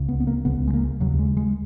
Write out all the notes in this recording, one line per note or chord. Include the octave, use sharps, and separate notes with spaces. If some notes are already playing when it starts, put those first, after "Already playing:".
Already playing: C#2 C#3
B3
B3
A#3
C#2 C#3 B3
G#3
A#3
D#2 C#3 F#3
G#3
G#3